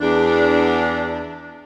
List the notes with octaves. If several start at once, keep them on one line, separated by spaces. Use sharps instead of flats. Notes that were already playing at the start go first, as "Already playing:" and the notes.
E2 D4